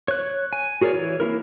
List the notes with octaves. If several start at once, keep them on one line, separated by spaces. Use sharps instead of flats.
C#5 F#6
G#5
F#4 G#4 A#4 C#5 D5
E3 C#5
A#3 C4 E4 A#4